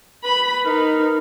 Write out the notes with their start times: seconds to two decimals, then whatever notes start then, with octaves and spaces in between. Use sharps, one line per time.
0.24 B4 B5
0.65 D#4 A#4